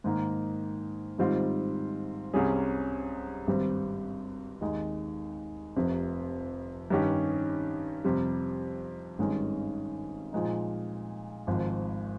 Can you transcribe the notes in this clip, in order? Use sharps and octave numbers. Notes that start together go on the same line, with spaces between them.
G#2 D#3 A#3
G#2 D#3 G3 C4 F4
C2 C3 G3 C#4 G#4
G#1 G2 G3 C4
D#2 D#3 G#3
F1 F2 C3
G2 D#3 G3 C#4 G4
F2 C3 G3
G#1 G2 D#3 G#3 C#4
A#2 F3 G#3 D#4
G#1 G#2 F3